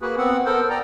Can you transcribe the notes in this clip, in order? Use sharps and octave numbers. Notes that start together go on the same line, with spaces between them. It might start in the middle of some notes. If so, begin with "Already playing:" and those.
A#3 F#4 G#4 B4
B3 C4 F#5
B3 A4 A#4 C5
D5 G5 A#5